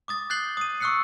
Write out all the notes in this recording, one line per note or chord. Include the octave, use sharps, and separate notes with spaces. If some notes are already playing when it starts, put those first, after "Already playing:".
D6 D#6 A6
F#6 G6 A6 C7 F#7 G7
D#6 D#7
C#6 D#6 E6 F#6 C7 C#7